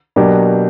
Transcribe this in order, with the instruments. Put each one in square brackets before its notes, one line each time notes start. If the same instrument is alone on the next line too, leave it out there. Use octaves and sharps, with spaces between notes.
[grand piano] B2 F#3 A#3 D4 G4